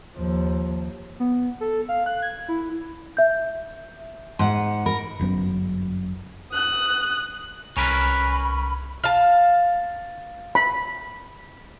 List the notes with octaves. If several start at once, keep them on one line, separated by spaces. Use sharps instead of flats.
D#2 F3
B3
A4
F5
F#6
G#6
E4
E5 G6
G#2 F#5 C6
A#4 B5
G1 F#2 F#3 B3
D#6 F#6
C2 C#4 A#4 B4 B5
F5 A5
B5